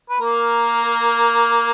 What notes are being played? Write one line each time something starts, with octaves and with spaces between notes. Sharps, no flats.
B4
A#3 A#4